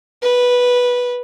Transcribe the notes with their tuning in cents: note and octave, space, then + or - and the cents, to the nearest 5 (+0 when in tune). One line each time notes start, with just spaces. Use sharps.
B4 -10